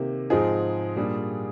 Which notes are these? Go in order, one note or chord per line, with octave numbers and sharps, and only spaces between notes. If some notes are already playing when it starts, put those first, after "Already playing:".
Already playing: C3 D#3 A#3 G4
G#2 F3 C4 D#4 F4 G#4
A#2 G3 D4